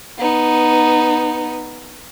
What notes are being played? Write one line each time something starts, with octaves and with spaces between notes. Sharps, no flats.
B3 D#4